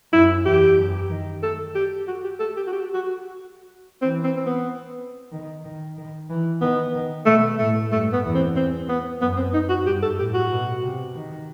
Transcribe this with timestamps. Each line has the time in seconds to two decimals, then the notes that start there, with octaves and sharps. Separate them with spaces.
0.13 F#2 E4
0.45 E2 G4
0.78 F#2
1.10 D#3
1.43 A4
1.75 G4
2.07 F#4
2.24 G4
2.40 A4
2.57 G4
2.67 F#4
2.73 G4
2.94 F#4
4.02 E3 C4
4.24 C4
4.36 C4
4.46 B3
5.32 D#3
5.64 D#3
5.97 D#3
6.29 E3
6.61 D#3 B3
6.94 D#3
7.26 B2 A3
7.59 A2 A3
7.91 G2 A3
8.13 B3
8.24 E2
8.34 C4
8.56 C4
8.89 B3
9.21 F#2 B3
9.37 C4
9.54 D#4
9.69 F#4
9.86 G2 G4
10.03 A4
10.18 A2 G4
10.34 F#4
10.51 B2
10.83 C3
11.16 D#3